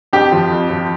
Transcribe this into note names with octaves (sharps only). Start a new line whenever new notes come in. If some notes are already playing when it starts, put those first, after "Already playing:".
F2 G4
F3
F2
F3